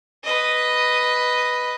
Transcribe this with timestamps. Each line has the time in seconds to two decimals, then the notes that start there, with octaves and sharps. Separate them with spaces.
0.24 B4 D#5